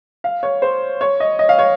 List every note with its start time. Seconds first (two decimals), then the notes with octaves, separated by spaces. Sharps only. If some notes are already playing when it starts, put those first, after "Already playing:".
0.24 F5
0.43 C#5
0.62 C5
1.01 C#5
1.20 D#5
1.39 D#5
1.49 F5
1.59 C#5